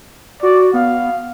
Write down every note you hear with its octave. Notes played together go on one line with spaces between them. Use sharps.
F#4 D5
B3 F5